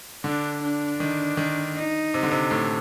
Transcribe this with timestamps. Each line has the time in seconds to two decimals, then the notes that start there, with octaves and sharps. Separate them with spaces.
0.24 D3 D4
0.62 D4
1.00 D#3
1.37 D#3
1.75 D#4
2.14 C3
2.23 D3
2.31 C3
2.51 A2